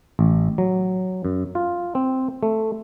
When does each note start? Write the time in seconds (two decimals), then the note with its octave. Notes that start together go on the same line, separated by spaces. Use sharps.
0.19 A1
0.58 F#3
1.25 F#2
1.55 F4
1.95 C4
2.43 A3